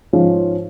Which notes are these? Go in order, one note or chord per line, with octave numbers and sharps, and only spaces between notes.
G#2 F3 C#4 F4